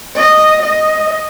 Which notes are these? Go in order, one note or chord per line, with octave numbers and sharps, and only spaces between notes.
D#5
D#5